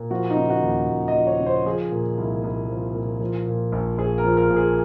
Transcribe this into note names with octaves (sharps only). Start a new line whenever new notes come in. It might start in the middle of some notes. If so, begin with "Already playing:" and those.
Already playing: A#2
F3 F#4
D#4
C#3
F#4
D#2
D#2
D#5
F3
C#5
C#3
C5
F3 G#4
A#2
C2
C2
F3
A#2
F3
A#2
A#1
A#1 G#4
A#4
F3
A#4
A#2
G#4